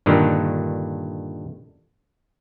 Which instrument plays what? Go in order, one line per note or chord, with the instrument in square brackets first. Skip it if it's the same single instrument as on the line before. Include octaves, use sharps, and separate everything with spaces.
[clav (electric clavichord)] G2 A#2 D3 D#3